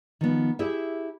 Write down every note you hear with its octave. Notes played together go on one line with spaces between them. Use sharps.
D#3 F3 B3
E4 G4 G#4 E5